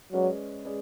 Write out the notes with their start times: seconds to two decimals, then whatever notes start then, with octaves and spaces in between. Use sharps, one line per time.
0.12 F#3 G#3 C#4 G#4 B4 D5
0.65 G#3 C#4 G#4 B4 D5